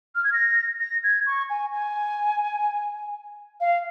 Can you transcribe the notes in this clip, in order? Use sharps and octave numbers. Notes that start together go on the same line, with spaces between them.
F6
G#6
A#6
A#6
G#6
C#6
G#5
G#5
F5